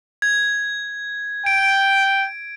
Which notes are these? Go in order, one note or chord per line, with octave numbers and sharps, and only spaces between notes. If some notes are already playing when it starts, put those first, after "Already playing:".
G#6
G5 D7